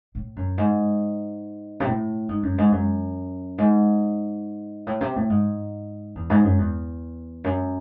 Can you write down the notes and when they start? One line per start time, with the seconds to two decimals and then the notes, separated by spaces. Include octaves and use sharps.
0.15 A2
0.36 F#2
0.58 G#2
1.80 C3
1.87 A2
2.29 G#2
2.43 F#2
2.58 G#2
2.72 F#2
3.58 G#2
4.87 A2
5.01 C3
5.16 A2
5.30 G#2
6.15 E2
6.30 G#2
6.44 F#2
6.58 E2
7.44 F#2